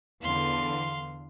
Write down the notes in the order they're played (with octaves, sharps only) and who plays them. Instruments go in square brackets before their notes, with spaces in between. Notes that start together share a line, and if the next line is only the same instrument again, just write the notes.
[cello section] E2 D3 [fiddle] F5 C6